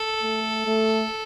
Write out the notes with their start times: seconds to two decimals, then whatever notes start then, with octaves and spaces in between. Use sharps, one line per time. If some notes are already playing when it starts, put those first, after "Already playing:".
Already playing: A4
0.22 A3
0.67 A3